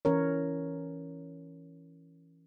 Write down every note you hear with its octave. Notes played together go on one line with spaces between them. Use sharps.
E3 C#4 A#4 C#5